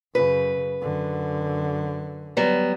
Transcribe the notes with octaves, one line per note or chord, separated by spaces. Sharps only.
F#2 C#3 B4
F#2 D3
F#3 G3 B3